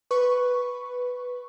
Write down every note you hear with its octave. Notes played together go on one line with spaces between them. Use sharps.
B4 C#6